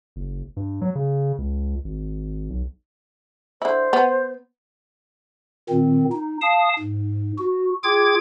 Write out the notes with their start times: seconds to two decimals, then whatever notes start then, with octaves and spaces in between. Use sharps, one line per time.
0.16 F#1
0.57 G2
0.81 F#3
0.95 C#3
1.38 C#2
1.84 G#1
2.50 B1
3.62 D3 E4 C5
3.93 B3
5.70 A#2 D#3 C4
6.12 D#4
6.41 F5 A5 D#6
6.79 G#2
7.38 F#4
7.84 F4 G#4 G5 D6 G#6